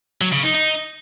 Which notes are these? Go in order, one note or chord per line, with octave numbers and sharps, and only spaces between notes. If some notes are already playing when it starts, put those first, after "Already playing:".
F#3
C#3
D#4
D#4